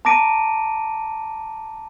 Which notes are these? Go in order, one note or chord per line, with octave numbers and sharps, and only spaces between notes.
A5 A#5 D6 A#6 D7 D#7